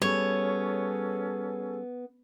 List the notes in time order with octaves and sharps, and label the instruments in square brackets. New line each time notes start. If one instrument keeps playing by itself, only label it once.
[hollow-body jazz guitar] G3 [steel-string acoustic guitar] B3 [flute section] C#4 G#4 A4 [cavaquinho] C#5